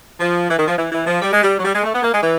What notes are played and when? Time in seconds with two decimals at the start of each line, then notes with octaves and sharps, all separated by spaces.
0.20 F3
0.48 E3
0.58 D#3
0.68 F3
0.78 E3
0.92 E3
1.07 F3
1.21 G3
1.33 G#3
1.43 G3
1.59 F#3
1.65 G3
1.74 G#3
1.84 A3
1.94 B3
2.03 A#3
2.13 G#3
2.22 E3